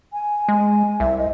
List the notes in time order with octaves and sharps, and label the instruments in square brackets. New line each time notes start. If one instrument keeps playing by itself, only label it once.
[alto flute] G#5
[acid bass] G#3
[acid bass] C2 [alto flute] E5
[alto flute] D#5